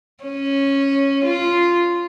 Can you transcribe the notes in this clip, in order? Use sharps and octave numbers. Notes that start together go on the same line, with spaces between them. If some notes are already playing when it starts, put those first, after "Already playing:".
C#4
F4